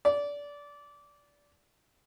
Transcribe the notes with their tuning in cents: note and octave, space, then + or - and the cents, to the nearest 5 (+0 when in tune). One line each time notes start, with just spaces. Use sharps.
D5 -20